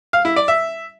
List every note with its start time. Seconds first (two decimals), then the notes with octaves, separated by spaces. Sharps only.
0.13 F5
0.25 E4
0.36 D5
0.48 E5